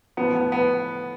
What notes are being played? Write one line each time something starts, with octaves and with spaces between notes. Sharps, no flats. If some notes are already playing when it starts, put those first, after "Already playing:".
A2 F3 B3
B3
B3